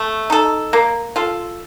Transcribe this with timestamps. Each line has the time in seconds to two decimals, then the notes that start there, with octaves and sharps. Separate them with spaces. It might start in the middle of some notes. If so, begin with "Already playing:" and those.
Already playing: A3
0.30 D#4 A4
0.73 A#3
1.16 F4 A4